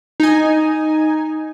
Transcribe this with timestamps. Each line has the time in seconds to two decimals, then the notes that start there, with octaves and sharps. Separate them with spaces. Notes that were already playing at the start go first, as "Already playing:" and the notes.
0.20 D#4 G#5